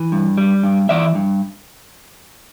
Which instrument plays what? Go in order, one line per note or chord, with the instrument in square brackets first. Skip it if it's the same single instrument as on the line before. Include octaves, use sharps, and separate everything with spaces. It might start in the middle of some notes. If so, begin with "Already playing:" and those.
Already playing: [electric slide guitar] E3
G2
G3
G2
E3 D5 E5
G2